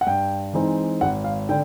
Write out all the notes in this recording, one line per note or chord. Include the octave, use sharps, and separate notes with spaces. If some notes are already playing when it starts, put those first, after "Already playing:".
F#5
G2 G5
E3 G#3 C4 D#4
G#1 F#5
F5
D3 G5